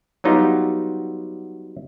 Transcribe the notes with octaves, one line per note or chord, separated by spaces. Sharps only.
F#3 G3 B3 D#4 F4 G4